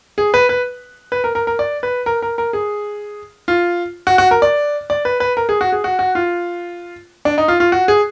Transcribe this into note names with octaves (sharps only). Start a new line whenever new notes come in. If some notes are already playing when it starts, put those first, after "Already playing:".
G#4
B4
B4
B4
A#4
A#4
A#4
D5
B4
A#4
A#4
A#4
G#4
F4
F#4
F#4
A#4
D5
D5
B4
B4
A#4
G#4
F#4
G#4
F#4
F#4
F4
D4
D#4
F4
F4
F#4
G#4